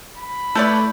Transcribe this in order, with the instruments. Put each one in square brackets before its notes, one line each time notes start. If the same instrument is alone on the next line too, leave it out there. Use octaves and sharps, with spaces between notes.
[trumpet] B5
[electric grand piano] A3 E4 G6 [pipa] A4 B4 D5